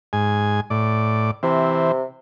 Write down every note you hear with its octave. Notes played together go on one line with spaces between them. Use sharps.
G#2 G#5
A2 D5
C3 E3 C4